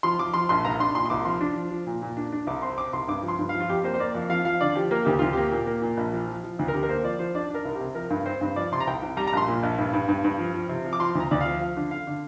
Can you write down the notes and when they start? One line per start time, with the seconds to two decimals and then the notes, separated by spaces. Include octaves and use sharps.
0.03 F3 C6
0.19 F3 D6
0.34 F3 C6
0.49 A#1 C6
0.65 C2 A#5
0.79 D4 C6
0.95 A#2 C6
1.05 C6
1.10 C2 D6
1.25 F3 C6
1.41 D4
1.56 F3
1.71 F3
1.87 A#2
2.02 A#2
2.17 D4
2.33 D4
2.47 C2 D6
2.62 C4 C6
2.78 C4 D6
2.93 C2 C6
3.08 G2 D6
3.23 F3
3.28 C6
3.39 G2
3.49 F5
3.55 F3
3.60 F4
3.69 F2 G4
3.84 A#3 C5
3.94 C5
3.99 A#3 D5
4.15 F2
4.29 F3 F5
4.45 F3 F5
4.61 D3 D5
4.75 F3 G4
4.91 A#3 A#4
5.05 D2 G4
5.19 D2 F4
5.33 A#3 G4
5.51 A#2
5.67 A#3
5.82 A#2
5.97 A#1
6.13 F3
6.28 F3
6.44 F3
6.59 D2
6.68 A#4
6.74 D3 G4
6.83 A#4
6.89 A#3 C5
7.04 F3 D5
7.19 F3 C5
7.35 D4 D5
7.50 D4 A#4
7.65 C2
7.75 G4
7.81 C3
7.95 F3 A#4
8.10 G2
8.26 C4 C5
8.41 G2
8.56 F3 D5
8.72 C3 C6
8.80 A#5
8.87 C2 G5
9.02 C2
9.17 G3 A#5
9.27 A#5
9.33 A#1 C6
9.48 A#2
9.63 A#1
9.78 G2
9.93 G2
10.09 G2
10.24 G2
10.39 F3
10.54 F3
10.69 C3
10.85 F3
10.93 D6
11.00 F3 C6
11.15 D2 A#5
11.31 D2 D5
11.41 F3 F5
11.61 F3 F5
11.77 D3
11.91 D3 F5
12.07 D3